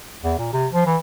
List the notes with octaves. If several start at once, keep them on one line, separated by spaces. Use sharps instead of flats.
E2
A#2
C3
F3
E3